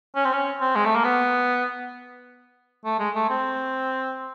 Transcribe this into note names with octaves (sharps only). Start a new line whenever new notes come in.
C#4
C4
C#4
C4
G#3
A3
A#3
B3
A3
G#3
A3
C4